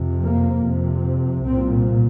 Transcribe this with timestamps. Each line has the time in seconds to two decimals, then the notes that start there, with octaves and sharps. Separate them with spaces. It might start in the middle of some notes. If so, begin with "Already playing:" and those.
Already playing: F2 C3
0.22 A#3
0.63 F2 C3
1.45 C2 A#2 C4